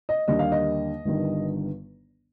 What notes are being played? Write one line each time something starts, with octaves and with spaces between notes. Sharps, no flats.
D#5
D#2 D3 G3 A#3 D#5
F5
D#5
G1 G2 D#3